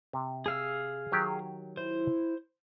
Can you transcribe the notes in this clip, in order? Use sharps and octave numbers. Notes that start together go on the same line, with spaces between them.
C3
G#4 F5 E6
D#3 F#3 G4
E4 C5